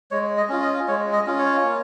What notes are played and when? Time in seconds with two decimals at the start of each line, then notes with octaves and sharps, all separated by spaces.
0.11 G#3 C#5
0.37 D#5
0.49 C#4 F4
0.62 D#5
0.88 G#3 C#5
1.13 D#5
1.27 C#4 F4
1.39 C#5
1.64 A#3